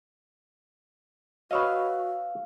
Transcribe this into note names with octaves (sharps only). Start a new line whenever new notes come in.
F#4 B4 C#5 D#5 F5 E6 F6